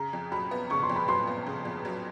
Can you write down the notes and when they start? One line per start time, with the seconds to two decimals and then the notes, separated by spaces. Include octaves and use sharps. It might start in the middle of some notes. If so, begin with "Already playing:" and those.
Already playing: C#3 A#5
0.13 F2
0.32 F#3 B5
0.51 B3
0.70 C#3 C#6
0.83 C6
0.89 F2
0.96 B5
1.08 F#3 C6
1.27 B3
1.46 C#3
1.65 F2
1.85 F#3